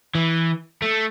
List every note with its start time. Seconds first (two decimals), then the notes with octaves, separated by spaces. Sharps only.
0.15 E3
0.82 A3